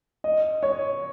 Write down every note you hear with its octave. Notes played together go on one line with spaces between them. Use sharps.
D#5
C#5